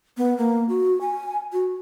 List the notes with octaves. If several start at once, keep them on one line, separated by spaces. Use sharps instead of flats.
B3
A#3
F#4
G#5
F#4